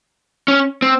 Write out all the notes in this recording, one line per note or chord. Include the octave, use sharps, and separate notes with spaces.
C#4
C4